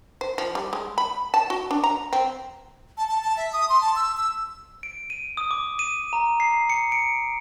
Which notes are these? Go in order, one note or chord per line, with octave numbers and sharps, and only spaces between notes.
C5
F3
G3
G#3
B5
A5
F#4
D4
A#5
C4
A5
A5
A5
E5
D#6
C6
A5
E6
E6
D7
D#7
D#6
D6
D#7
A#5
C7
C#7
D7